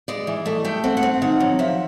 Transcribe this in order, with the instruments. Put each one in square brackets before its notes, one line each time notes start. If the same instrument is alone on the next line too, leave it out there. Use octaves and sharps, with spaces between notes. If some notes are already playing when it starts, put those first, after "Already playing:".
[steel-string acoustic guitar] G#3 D5
E3
A3 D#5
A3 G5
C4 F#5
F#5
C4
D#3 F#5
F#3
F3 E5